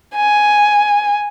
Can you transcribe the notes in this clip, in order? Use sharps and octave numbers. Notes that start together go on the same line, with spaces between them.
G#5